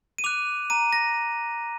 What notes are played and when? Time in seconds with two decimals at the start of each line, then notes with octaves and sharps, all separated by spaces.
0.18 D#7
0.24 D6 F#6 F7
0.70 A#5 D#7
0.93 A#6